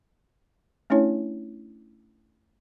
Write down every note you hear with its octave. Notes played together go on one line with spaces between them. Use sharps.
A3 C#4 D4 E4 C#5